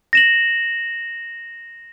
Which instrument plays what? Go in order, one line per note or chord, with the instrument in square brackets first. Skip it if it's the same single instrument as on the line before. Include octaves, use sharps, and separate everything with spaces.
[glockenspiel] A#6 E7 F#7